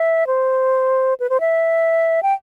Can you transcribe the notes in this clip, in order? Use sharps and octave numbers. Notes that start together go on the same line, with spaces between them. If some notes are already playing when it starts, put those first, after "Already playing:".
Already playing: E5
C5
B4
C5
E5
G5